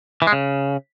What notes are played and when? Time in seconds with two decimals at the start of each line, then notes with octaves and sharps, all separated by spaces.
0.22 E3
0.27 G#3
0.32 C#3